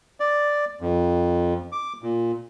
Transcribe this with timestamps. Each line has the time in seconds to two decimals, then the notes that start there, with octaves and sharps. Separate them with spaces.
0.20 D5
0.81 F2
1.72 D6
2.02 A#2